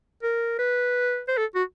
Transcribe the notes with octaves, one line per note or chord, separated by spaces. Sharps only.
A#4
B4
C5
A4
F#4